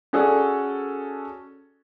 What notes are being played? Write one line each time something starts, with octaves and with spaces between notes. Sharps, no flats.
C#4 F#4 G#4 A4 D5